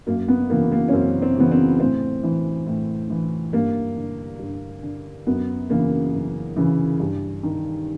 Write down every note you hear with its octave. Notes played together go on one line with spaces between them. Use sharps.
F#2 A#3
B3
C#3 E3 A#3
A#3
C#4
F#2 C4
C4
C#3 E3 B3
C4
A2 C4
E3
A2
E3
G2 A#3
D3
G2
D3
F#2 B3
C#3 E3 A#3
F#2
C#3 E3
G2
D#3